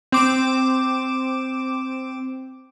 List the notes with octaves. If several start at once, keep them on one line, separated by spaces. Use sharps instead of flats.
C4 D6 E7